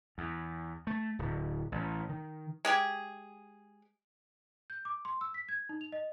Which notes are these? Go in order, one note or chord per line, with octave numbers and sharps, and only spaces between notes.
E2
A3
D1
A1
D#3
G#3 G4 G#4
G6
D6
C6
E6
B6
G#6
D#4
F7
D#5